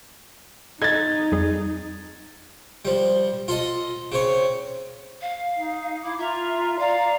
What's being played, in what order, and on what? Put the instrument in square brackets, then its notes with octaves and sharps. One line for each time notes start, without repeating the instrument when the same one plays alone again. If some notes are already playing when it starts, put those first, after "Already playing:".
[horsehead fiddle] D#4 [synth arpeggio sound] A4 D#5 [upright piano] G#6 A6
[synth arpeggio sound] F2 G3 G#4
[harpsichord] F3 G3
F4 A4 D#5
C#3 C4 C#5
[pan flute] F5
[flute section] D#4
[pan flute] E4 [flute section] D6
[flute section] F4 A#5 [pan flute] E5
[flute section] D5 A#5 [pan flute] F5